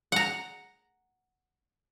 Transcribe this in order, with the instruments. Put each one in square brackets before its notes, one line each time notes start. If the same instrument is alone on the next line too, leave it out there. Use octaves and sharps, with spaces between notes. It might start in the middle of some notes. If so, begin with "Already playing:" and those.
[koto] F#5 A#5